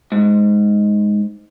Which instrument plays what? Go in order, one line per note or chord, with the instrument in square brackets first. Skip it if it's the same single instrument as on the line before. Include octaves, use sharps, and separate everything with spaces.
[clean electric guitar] G#2